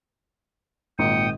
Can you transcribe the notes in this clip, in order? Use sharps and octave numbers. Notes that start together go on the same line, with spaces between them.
G#1 A#2 G5 D#6 C#7